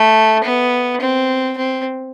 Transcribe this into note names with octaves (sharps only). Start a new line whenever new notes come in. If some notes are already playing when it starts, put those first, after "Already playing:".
Already playing: A3
B3
C4
C4